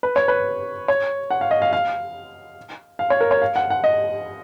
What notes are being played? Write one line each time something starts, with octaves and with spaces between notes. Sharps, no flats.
B4
C#5
B4
C#5
F#5
F5
D#5
F5
F5
F5
C#5
A#4
C#5
F5
F#5
F#5
D#5